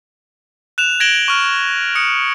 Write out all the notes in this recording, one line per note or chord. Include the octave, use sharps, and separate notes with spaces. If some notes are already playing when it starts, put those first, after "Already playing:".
F#6 E7 F7
G#6 A#6 D7 E7 F#7 G7
C#6 F6
D#6 C#7